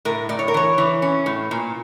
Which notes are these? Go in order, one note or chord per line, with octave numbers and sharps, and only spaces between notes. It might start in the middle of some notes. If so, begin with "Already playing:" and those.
A2 A#4
A2 D5
C#5
A#4
E3 C#5
E3
C#4
A2
A#2